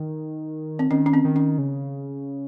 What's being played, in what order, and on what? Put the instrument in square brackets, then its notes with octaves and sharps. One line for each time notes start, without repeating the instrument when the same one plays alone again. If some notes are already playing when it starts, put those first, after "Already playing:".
Already playing: [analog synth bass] D#3
[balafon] C4
[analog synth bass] D#3 [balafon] C#4
[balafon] C#4
C4
[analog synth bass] D#3
[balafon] C#4
[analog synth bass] C#3